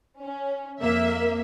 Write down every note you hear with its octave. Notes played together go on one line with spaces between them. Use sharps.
C#4
F2 A#3 E5